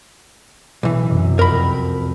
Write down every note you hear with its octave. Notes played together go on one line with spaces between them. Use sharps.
B1 E3
C2 F#2
F2 F#3 A#4 G5 B5